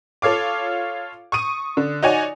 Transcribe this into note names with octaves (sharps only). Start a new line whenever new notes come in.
F4 A4 C#5 F5 D6
C#6 D#6 D#7
D3
D#4 F#4 C#5 D5 G#5